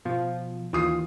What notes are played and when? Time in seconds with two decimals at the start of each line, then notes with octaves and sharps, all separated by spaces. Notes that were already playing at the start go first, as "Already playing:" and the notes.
0.05 B2 F3
0.73 D#2 E3 F4 D#6 C7